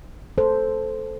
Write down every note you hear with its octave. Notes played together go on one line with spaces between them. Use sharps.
A4 C5